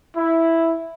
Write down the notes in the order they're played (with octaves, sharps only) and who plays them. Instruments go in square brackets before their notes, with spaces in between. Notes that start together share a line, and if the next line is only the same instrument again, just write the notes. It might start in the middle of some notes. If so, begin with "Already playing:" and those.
[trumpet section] E4